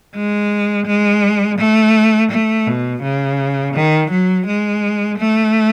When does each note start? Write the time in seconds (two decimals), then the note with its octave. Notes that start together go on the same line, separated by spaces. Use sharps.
0.15 G#3
0.86 G#3
1.58 A3
2.31 A3
2.67 B2
3.03 C#3
3.74 D#3
4.11 F#3
4.47 G#3
5.18 A3